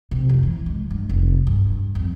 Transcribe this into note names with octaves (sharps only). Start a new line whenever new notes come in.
C3
F2
E3
G#3
G2
F1
G2
F2